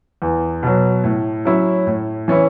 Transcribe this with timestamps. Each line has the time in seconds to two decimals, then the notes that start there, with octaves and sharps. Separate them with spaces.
0.22 E2
0.63 B2 F#3
1.04 A2
1.45 F#3 C#4 E4
1.87 A2
2.28 E3 C#4 E4